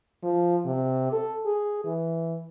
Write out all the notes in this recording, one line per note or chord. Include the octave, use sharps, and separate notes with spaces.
F3
C3
A4
G#4
E3